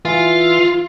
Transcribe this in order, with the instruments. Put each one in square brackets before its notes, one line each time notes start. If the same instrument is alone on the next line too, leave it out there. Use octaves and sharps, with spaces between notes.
[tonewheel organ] E3 F5 [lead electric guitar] F4